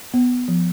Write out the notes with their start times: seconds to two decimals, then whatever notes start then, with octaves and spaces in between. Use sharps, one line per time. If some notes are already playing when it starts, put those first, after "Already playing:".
0.14 B3
0.48 F3